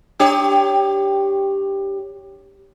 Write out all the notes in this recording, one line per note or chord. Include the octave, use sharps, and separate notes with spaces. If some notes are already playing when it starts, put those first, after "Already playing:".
D4 G4 C#5